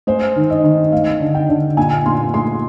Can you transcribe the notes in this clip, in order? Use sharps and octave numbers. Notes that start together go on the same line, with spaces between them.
G#3 C5
D#3
D#5
D#3
G#3 F5
D3
G5
D3
A#2 G#5
A#2 C6
G#3 C6